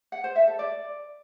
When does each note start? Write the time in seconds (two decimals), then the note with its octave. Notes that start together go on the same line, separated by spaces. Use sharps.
0.12 F#5
0.24 C5
0.36 E5
0.47 A4
0.59 D5